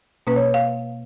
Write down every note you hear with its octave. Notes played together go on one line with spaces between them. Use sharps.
B2 A#3 C#4 B4
C#5
F5